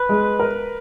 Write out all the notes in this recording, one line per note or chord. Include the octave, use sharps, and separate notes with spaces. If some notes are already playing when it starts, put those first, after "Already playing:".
Already playing: B4
G#3
A#4